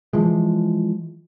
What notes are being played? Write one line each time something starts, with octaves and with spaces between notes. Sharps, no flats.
E3 F3 G#3